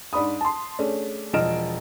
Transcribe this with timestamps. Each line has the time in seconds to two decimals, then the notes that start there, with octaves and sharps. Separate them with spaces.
0.13 G#2 D4 B5 D#6
0.41 A5 C6
0.79 A3 C#4 D4 G#4
1.34 E1 F3 D#5 F6 D7 E7